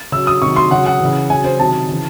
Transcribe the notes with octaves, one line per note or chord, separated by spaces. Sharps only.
C#3 F#3 E6
D#6
C3 D#3 F#3 C#6
C6
C#3 F#3 F#5
F#5
C#3 E3
C#3 F#3 G#5
C5
C3 D#3 F#3 A5
C#3 E3